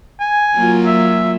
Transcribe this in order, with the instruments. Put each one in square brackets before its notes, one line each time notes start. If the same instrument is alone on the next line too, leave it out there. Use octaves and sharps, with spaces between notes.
[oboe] G#5
[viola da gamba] F#3 A#3 F4
[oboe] E5